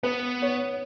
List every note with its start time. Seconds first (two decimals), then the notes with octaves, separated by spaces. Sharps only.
0.03 B3 B4
0.42 C#5